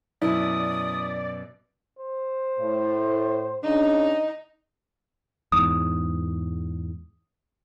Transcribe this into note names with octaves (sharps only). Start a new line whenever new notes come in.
F#2 B2 E4 D5 D#6
C5
A2
C#3 D4 D#4
E2 G#2 D#6